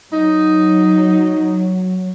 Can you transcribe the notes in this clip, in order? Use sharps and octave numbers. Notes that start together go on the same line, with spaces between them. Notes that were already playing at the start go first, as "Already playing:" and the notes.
F#3 D#4